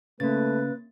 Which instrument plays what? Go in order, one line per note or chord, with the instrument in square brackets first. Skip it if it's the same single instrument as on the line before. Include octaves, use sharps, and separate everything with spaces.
[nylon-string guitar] C#3 [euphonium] A3 [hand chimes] A#3 A6 [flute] B4